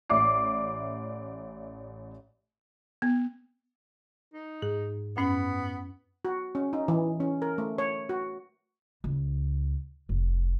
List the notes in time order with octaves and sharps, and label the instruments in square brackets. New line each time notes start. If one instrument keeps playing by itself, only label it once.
[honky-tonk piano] A1 D5 E5 D6 C7
[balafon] B3
[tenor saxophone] D#4
[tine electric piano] G#2 [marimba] G#4
[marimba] F#2 C#4 [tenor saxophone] B3
[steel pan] F#4
C#4
D#4
E3
C#4
A#4
A3
C#5
F#4
[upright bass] C#2
F1